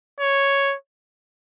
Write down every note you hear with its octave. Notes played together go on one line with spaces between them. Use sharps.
C#5